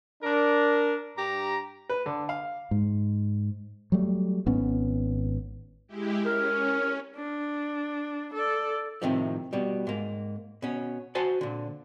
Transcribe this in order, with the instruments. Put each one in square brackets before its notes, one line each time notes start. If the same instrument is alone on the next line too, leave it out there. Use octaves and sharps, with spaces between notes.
[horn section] D4 A#4
G2 G4 A#5
[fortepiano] B4
D3
F5
[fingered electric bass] G#2
F#3 G3 A3
G#1 B3 C#4
[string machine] G#3 E4 G4
[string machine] C#4 [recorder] A#4
[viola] D4
A4 D5
[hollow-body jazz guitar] A2 C3 D#3 F3
B2 G3
G#2 A#3
B2 C#4
F#4 C5 G#5 A5
A#2 D3